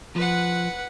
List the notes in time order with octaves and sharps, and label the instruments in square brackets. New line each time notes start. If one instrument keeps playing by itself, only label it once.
[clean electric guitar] F3 [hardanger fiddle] B4 F#5